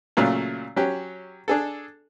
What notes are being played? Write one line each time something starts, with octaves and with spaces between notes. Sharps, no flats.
A#2 C#3 F#3 A3 F4
F#3 C#4 G4
D4 G#4 A4